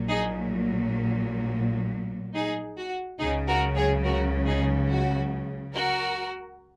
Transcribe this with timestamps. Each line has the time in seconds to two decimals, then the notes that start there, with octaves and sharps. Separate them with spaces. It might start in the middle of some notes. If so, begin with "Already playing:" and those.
Already playing: A#1 A#2 F#3
0.08 D#4 G#4
2.34 D#4 G#4
2.77 F#4
3.19 C#2 C#3 F#3 D#4 G#4
3.48 F#4 A#4
3.75 G#4 C#5
4.04 F#4 A#4
4.46 D#4 G#4
4.88 F#4
5.73 F#4 A#4